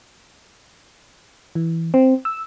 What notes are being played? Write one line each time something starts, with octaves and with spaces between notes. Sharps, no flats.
E3
C4
E6